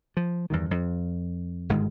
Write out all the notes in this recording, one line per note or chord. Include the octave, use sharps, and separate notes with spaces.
F3
E2 G2 D#3
F2
G1 G#2 D#3 G#3